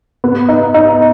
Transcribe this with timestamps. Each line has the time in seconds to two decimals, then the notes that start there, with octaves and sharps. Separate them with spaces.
0.24 B3
0.49 D#4
0.74 D#4